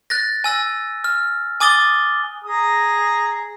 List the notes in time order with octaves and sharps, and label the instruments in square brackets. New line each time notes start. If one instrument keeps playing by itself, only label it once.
[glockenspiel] F#6 A6 A#6
G#5 E6 A#6
F6
G#5 D6 D#6 A6 G7
[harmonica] G#4 A#5 D#6